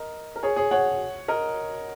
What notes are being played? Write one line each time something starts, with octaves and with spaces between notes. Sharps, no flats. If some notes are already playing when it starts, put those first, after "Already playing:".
Already playing: A#4 D#5
A#4
G#4 C#5
G#4 C#5
C#5 F#5
A#4 D#5